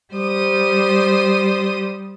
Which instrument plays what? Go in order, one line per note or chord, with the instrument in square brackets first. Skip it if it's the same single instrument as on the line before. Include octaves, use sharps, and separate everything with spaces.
[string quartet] G3 C5 D#6